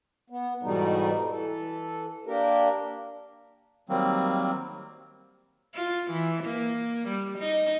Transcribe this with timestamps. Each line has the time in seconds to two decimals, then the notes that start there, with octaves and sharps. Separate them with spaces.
0.30 B3
0.63 G#2 B2 E3 G3 A3 D#4
1.31 E3 A4
2.27 A#3 D4 G4 A#4
3.89 D#3 F#3 G3 A#3 C4
5.74 F4
6.11 E3
6.44 A#3
7.08 G3
7.39 D#4